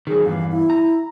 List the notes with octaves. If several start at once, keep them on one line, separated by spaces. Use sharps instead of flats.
D#3 F#3 G#4
E2 G2 E3 F5
E4
A#5